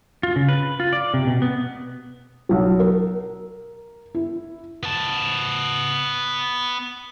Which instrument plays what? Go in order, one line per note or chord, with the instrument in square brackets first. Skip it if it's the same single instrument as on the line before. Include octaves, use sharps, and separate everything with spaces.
[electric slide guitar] F4
C#3
B4
F4
D5
C3
B2
B3
[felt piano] B1 F#3
A#4
E4
[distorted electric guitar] B3 A5